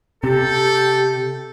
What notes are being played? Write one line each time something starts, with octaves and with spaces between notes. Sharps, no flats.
C3 G4 A4